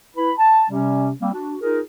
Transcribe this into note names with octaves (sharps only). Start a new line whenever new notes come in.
E4 B4 B5
A5
C3 G3 C#4
G3 A#3 C4
D4 F#4
D#4 F4 G#4 A#4